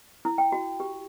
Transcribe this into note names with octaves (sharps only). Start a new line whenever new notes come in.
E4
G5
F#4
G4